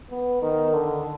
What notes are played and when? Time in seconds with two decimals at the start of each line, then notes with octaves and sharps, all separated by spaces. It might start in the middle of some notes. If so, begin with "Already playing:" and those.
0.11 B3
0.42 D#3
0.74 D3